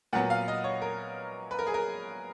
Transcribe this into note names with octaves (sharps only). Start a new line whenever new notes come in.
A#2 F#3 B3 F#5
F5
D#5
C#5
A#4
B4
A#4
G#4
A#4